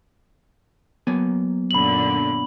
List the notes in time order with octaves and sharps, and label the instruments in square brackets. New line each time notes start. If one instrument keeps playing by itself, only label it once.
[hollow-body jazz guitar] F#3 A#3 G#5 [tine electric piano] B3
[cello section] F#2 A#2 D3 [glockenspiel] B5 F#7